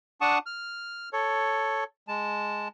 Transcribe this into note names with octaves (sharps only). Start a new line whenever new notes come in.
D4 F#5 A5 C#6 D#6
F6
A4 C#5
G#3 A5